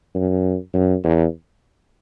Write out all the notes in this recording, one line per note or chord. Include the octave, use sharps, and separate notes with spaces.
F#2
F#2
E2